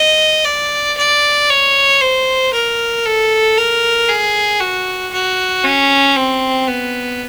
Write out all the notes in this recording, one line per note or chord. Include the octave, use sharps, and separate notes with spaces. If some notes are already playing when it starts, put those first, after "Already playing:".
Already playing: D#5
D5
D5
C#5
C5
A#4
A4
A#4
G#4
F#4
F#4
C#4
C4
B3